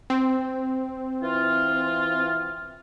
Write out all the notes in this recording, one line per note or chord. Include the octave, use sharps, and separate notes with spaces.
C4
E3 F4